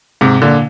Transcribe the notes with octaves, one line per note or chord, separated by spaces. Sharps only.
G#2 C3
A#2 D3